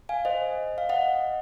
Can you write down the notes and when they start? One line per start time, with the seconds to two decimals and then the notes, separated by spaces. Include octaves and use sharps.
0.09 F5 G#5
0.25 C5 D#5
0.78 F5
0.89 D#5 F#5